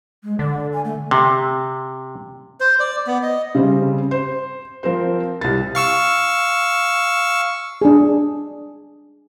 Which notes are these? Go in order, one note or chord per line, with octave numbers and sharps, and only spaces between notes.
G#3
D3 D5
G#5
A3
C3
C5
D5
B3
D#5
C#3 G3 C4
C5
F3 C4 A#4 C5
C2 A6
F5 C#6 E6
D4 G#4